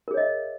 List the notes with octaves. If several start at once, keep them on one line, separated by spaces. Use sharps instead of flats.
G#4 A#4 C#5 D#5 E5